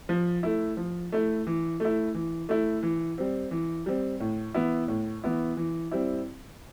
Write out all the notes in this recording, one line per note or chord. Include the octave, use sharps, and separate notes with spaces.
F3
A3 E4
F3
A3 E4
E3
A3 E4
E3
A3 E4
E3
G3 C4
E3
G3 C4
A2
E3 B3 E4
A2
E3 B3 E4
E3
G3 C4 E4